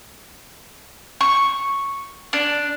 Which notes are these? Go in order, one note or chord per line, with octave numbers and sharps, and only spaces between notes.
C#6
D4